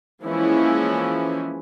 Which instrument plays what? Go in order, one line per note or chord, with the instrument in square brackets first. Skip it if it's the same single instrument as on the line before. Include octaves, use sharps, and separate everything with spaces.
[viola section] E3 F3 G#3 A#3 C#4 E4